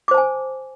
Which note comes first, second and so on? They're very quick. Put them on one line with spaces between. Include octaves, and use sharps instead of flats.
D6 C5 A5 G#5